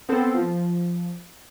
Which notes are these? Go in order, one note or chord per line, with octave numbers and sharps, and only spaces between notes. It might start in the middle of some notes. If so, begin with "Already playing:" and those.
B3 C4 A4 C5
F3